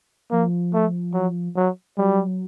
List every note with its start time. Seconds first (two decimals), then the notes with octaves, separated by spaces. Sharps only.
0.31 F3 A#3
0.74 A3
1.14 F#3
1.57 F#3
1.97 F#3 G3